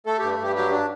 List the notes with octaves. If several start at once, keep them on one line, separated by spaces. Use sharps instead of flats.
A3 A4
G2 G4
G2 G4
F#3 G4
D4